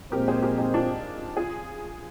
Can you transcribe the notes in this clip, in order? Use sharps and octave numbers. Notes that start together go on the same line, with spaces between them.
A#1 A#2 G#3 C4 G4 A#4
G#4 C5
G4 A#4
D#4 G4
D4 F4
F4 G#4